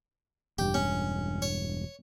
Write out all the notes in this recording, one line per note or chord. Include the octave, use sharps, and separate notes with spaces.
E1 G2 G4
C#4
C#5